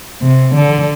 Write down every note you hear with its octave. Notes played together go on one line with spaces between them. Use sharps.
C3
D3